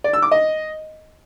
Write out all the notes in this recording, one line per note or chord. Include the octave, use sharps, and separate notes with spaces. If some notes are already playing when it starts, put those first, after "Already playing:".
D5
E6
D6
D#5